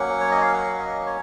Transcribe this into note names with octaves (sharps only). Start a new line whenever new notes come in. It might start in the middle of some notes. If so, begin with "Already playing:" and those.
Already playing: F#3 A#3 C#4 F#5
C#5
D#5
F5
F#5
D#5
C#5